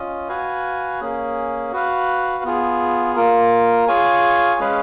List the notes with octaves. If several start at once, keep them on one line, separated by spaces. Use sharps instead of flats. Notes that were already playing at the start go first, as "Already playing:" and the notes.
Already playing: C#4 F4 D#5
F#4 B4 F5 G#5
A#3 C#4 G#4
F#4 B4 F5
B3 F4 G#4
A#3 F4 A#4
F4 G#4 C#5 F5 G#5
G#3 C#4 G#4 B4 F5